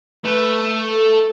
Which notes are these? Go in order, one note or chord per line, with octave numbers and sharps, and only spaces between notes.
A3 B4
A4